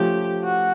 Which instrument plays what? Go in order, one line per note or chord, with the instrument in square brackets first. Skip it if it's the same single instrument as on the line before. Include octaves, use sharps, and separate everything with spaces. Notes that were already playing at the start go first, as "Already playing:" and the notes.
Already playing: [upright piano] F3 A3 C#4 [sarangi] G4
[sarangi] F#4